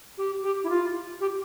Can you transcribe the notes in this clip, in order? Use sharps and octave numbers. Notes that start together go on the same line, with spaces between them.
G4
G4
E4
F4
G4